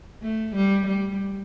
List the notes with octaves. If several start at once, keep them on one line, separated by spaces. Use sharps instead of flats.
A3
G3
G3